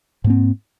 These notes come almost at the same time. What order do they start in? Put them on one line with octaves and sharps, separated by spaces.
G#2 A#3 C4